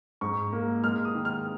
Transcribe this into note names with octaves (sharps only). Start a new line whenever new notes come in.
G#2 C#6
A#3
G#3 F6
D#6
D#3
F6